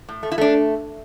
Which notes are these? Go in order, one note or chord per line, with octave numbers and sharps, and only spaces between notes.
A2
A3
E4
A3 D4